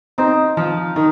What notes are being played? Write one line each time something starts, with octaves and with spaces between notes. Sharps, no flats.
C4 D#4
F3 F5
D#3 A#4